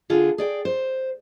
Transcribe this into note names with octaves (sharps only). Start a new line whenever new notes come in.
D3 F4 G#4
G#4 D5 G5
C5